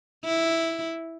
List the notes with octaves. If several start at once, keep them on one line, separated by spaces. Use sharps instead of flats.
E4